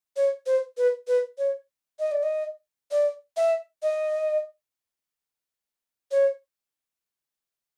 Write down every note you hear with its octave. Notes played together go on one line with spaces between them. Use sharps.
C#5
C5
B4
B4
C#5
D#5
D5
D#5
D5
E5
D#5
C#5